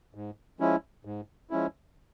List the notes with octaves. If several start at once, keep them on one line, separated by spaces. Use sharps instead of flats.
G#2
F3 G#3 C#4 E4
G#2
F3 G#3 C#4 E4